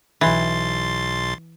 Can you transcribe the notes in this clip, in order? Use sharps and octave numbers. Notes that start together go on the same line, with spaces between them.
B1 E3 C6 A6